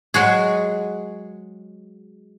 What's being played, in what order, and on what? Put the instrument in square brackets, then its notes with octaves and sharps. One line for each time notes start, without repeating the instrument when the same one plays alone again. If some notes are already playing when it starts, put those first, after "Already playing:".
[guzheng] F#3 G#3 F#4 G#4